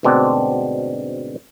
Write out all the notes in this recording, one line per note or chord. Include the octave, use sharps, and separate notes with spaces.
D2 G#2 B2 C4 D4